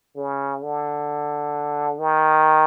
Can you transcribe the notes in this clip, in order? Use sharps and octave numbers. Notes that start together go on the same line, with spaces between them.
C#3
D3
D#3